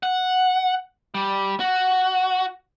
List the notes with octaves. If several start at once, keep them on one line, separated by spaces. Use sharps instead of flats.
F#5
G3
F#4